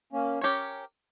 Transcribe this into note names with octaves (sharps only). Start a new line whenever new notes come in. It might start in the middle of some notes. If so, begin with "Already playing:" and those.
A#3 C#4
C#4 G4 A#4 C#5